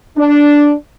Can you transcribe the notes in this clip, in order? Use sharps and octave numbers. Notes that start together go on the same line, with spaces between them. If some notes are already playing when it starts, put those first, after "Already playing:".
D4